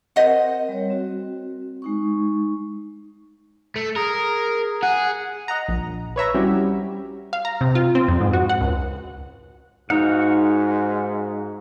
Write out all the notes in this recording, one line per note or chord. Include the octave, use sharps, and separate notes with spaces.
C4 A#4 C5 D#5 F#5
G3 C#5
C4 F#4
G#3 D#4 C#6
A3
G#4 A#4
G#4 F#5
D#5 F#5 A#5
A#1
B4 C#5 E5 A#5
G3 C4 C#4 E4 F#4 G4
F5
A#5
C3
F4
C4
F2
G#2
F#4
F#5
C#2
G#2 D#4 F#4 F5 F#5